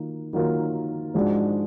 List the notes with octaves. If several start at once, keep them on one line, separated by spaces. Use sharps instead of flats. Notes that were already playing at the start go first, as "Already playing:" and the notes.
Already playing: D#3 F#3 A#3 F4
D#3 F#3 A#3 F4 A#4
G#2 F3 G#3 D4 F#4